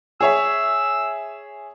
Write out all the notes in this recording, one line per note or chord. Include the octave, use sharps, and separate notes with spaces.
G#4 C#5 E5 E6